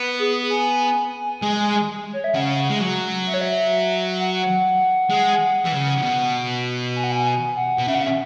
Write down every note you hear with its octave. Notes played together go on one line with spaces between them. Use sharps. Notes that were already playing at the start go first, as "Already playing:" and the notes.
Already playing: B3
G#4
G#5
G#3
C#5
E5
C#3 F#5
G#3
F#3
E5
C#5
E5
F#5
G#3
E3
C#3
C#3
B2
G#5
F#5
G#5
G#5
F#5
B2
C#3 E5
F#5
E5